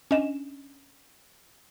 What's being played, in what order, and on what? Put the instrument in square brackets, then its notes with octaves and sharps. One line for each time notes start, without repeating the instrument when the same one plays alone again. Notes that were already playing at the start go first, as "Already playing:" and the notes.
[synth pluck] C#4 D4 D#5 E7